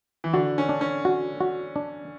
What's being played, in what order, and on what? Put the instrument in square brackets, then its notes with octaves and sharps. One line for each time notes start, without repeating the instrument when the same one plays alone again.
[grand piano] E3
[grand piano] D3 [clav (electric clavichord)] F#4
[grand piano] C#4
[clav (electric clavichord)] D4
[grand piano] C#4
[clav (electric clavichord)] F#4
F#4
D4